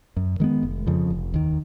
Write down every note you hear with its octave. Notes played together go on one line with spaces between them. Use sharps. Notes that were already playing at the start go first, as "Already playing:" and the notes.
F#2
D#3 G#3 B3
F1
F2 C#3 F3
F1
D#2 D#3